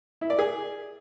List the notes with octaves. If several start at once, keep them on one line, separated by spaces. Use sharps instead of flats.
E4
D5
G#4